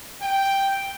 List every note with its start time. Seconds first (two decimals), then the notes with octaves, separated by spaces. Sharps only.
0.21 G5